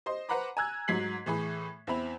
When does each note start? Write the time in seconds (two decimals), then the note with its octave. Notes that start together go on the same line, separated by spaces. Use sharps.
0.06 C5 D#5 C6
0.29 B4 C5 F#5 A#5 B5 D6
0.57 G#5 A#5 E6 F#6 G#6
0.88 G#2 F#3 G#6 B6 C7 F#7
1.26 A2 E3 G#4 B5
1.87 E2 C4 E4 B5 F7